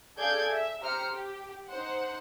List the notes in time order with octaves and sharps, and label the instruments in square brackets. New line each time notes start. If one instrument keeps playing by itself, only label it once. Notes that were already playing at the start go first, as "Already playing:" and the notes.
[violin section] G#4 A4 D5 F5 G6 G#6
E5
G4 C5 A#5 F6 C#7
G4
D#4 C5 F#5